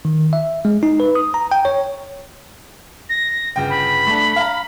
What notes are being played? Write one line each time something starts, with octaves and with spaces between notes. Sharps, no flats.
D#3
E5
G#3
D#4
B4
D#6
A#5
G5
C#5
A#6
G1 C#3 G5
B5
A3 D4
F5 A#5